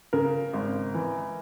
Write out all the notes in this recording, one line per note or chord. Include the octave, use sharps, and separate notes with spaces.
C#3 A#4
G#1
E3